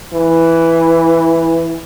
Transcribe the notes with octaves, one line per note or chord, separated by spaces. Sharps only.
E3